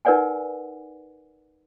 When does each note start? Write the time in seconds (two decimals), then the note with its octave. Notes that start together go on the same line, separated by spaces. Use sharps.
0.05 D#4 A#4 B4 D5 F#5 G#5